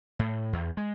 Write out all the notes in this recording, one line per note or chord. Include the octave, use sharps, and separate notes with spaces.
A2
E2
G#3